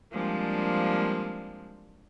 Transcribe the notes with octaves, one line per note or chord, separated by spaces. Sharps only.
F3 G3 G#3 A#3 C4 D4